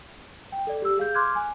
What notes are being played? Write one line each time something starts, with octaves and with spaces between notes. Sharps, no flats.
G5
A4 D5
G4 E6
G#4 F5 G6
C6 D6 F6 F#6 G#6
G#5